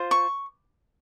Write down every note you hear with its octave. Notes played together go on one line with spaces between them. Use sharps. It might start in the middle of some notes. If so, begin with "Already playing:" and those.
Already playing: F4 C5
C#6